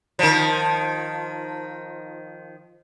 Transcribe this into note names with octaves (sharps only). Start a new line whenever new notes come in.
D#3 F3